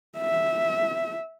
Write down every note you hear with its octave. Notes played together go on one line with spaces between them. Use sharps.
E5